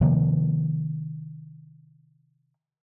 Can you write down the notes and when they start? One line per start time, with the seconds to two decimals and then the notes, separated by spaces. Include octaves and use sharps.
0.01 C3 D#3 F3 A#3